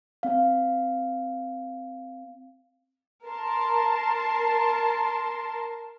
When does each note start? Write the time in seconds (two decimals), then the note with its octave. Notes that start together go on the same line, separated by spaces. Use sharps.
0.23 C4 F5
3.25 A#4 A5 C6